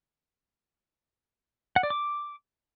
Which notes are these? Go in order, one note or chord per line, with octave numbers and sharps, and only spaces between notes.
F#5
D5
D6